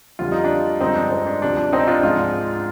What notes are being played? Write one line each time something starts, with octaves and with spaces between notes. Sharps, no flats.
F2 D3 G3 F4
D#4
D4 F4
G2 D3 F3 G#3 C4 D#4
D4
C4
D4
D2 C3 F3 D4
D4
C4 D#4
D4 F4
G#2 F3 G#3 D4 F4